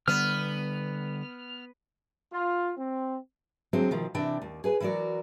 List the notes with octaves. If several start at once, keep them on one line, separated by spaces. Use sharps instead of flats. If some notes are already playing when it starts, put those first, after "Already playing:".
D3 G3 B3 F6
F4
C4
D3 F#3 G#3 C4
B2 D#3 F3
C3 E3 D4 G5
D#2
G#4 B4 G#5
E3 F#3 F#4 A#4 D5